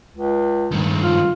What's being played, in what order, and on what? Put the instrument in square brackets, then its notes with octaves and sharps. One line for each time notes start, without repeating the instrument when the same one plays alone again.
[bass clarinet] C#2
[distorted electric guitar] G2 D#3
[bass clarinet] F4